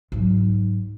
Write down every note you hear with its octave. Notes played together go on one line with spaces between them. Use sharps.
G#2 F#3